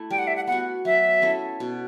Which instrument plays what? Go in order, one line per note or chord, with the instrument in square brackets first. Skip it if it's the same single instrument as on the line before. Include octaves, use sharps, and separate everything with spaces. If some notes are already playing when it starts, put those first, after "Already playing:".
Already playing: [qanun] A3 E4
[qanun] G3 [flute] G5
[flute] F#5
E5
F#5
[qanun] B3 F#4 [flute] F#5
[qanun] F#3 [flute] E5
[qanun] C#4 E4 A4
B2